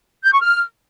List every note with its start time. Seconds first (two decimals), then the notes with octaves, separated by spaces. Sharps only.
0.24 G6
0.32 C#6
0.41 F6